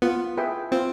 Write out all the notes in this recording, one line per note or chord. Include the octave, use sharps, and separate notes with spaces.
B3 F4
G#4 B4 E5 G5
C4 F4